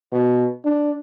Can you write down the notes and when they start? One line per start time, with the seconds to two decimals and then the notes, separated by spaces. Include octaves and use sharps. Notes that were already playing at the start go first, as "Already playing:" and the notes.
0.12 B2
0.65 D4